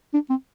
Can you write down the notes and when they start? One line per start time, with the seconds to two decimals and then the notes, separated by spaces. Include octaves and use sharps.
0.14 D4
0.30 C4